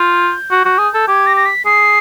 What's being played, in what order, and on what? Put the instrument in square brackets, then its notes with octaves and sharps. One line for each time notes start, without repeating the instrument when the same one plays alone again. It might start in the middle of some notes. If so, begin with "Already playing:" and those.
Already playing: [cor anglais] F4 [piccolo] G6
[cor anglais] F#4
F#4
G#4
A4
[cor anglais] G4 [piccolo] G#6
[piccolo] A#6
A#6
B6
[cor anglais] G#4 [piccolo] C7